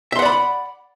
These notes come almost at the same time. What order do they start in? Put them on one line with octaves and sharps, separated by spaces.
E5 C6 F#5 D5 B5